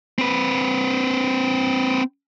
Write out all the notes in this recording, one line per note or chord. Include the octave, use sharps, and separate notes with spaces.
C4 B4